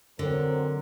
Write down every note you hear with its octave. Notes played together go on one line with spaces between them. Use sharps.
D3 F#3 C4 A#4